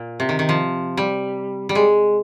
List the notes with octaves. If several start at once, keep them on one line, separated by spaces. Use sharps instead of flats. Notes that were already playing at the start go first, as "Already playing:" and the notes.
Already playing: A#2
C3
D#3
D#3
F3
G3
G3
G#3